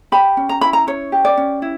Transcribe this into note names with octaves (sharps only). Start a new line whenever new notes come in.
G4 B5
C#4
A#5
E4 B5
A#5
C#4 C#5
G4
D5
C#4
E4